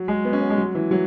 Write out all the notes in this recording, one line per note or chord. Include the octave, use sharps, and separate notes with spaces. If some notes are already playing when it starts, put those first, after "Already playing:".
Already playing: F#3
G#3
B3
C#4
B3
G#3
F#3
E3
F#3